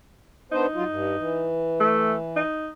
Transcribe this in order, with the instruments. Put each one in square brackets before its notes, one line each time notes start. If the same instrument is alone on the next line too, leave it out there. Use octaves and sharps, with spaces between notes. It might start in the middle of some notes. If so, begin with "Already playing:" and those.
[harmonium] B3 D4 C5 [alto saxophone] D#4
[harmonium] F#3 F4
G2
E3
[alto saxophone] A3
D#4